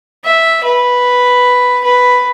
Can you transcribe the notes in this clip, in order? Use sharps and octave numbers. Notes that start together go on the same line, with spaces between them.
E5
B4
B4